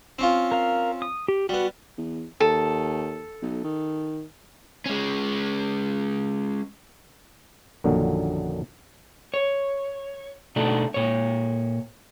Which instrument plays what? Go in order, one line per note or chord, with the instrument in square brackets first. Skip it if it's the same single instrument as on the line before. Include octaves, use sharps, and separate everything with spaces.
[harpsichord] C4 C#4 F4
[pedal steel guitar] A#4 F5
D#6
G4
[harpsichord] G3 B3 [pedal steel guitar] F#4
[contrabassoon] E2
[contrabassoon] D#2 [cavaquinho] A4
[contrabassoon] B1
D#3
[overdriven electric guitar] G#3 C#4
[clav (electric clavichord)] A#1 F#2 A#2 D3 D#3 F#3
[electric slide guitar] C#5
B2 A3 D4 D#4
A#2 C#5